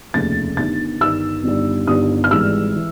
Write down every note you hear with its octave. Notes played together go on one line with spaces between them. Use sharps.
F1 D#2 C#3 F3 A3 A6
G1 G2 D#3 G3 A6
G1 G2 D#3 G3 E6
G1 G2 D#3 G3
G1 G2 D#3 G3 D#6
F6
G#1 G#2 E3 G3 E6
E3